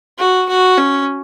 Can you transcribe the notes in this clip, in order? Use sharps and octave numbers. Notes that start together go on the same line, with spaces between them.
F#4
F#4
C#4